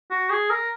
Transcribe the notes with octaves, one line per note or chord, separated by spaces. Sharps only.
F#4
G#4
A#4